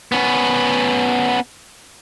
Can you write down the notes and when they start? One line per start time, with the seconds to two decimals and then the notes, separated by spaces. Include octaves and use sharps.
0.12 B3 C#4